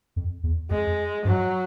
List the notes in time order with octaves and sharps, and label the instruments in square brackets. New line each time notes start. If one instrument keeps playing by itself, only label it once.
[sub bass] F2
E2
[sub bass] F2 [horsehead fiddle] G#3
[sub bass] G2 [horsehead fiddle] F#3